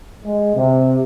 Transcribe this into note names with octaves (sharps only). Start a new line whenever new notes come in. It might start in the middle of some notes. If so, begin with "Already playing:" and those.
G#3
C3